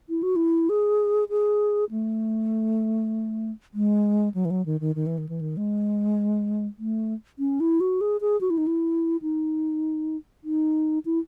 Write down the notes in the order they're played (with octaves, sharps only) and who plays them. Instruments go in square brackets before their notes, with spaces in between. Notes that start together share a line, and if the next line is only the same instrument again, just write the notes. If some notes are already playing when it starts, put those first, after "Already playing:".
[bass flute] E4
F#4
E4
G#4
G#4
A3
G#3
F#3
E3
F#3
D#3
D#3
D#3
E3
D#3
E3
D#3
G#3
A3
C#4
E4
F#4
G#4
G#4
F#4
E4
D#4
E4
D#4
D#4
E4